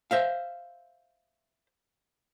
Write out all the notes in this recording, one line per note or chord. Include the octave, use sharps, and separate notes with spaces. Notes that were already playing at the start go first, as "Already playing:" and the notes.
C5 E5 F5